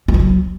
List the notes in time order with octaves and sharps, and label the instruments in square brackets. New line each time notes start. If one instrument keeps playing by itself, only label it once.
[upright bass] G3
F3
F#3